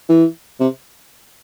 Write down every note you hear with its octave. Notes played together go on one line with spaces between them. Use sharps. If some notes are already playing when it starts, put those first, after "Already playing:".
E3
C3